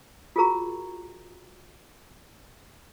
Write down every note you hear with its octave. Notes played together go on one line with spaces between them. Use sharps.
F4 F#4 G#4 A#4 A#5 C#6